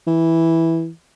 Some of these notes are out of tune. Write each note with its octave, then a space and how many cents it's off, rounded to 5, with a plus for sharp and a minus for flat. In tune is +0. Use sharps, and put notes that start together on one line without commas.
E3 -5